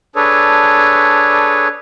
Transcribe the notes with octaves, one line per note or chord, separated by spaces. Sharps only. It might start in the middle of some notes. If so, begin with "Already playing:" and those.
D4 G#4 A4 B4 C#5